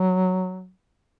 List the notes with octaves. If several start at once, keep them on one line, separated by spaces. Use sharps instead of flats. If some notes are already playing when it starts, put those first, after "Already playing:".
Already playing: F#3